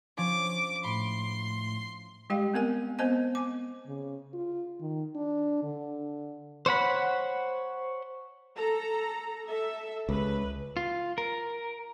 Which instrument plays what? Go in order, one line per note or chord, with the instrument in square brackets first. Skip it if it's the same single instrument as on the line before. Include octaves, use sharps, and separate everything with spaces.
[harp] F3 C#4 D4 [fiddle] D6
[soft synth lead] A2 [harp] B5 [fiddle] C6
[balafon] G3 G#3 G4 F5 G5
B3 C4 A#4 G#5
B3 C4 C5 D#5 G#5 A5
G#5 D6
[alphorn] C#3
F4
D#3
D4
D3
[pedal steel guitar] C5 C#5 F#5 B5
[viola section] A4 A#5
A4 E5
[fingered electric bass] C#2 [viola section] B4
[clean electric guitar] F4
A#4